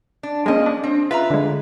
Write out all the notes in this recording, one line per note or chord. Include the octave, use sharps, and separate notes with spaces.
D4
F3 G#3 A#3 C#4 D#5
D4
C4
F4 B4 E5 A#5
D3 G#3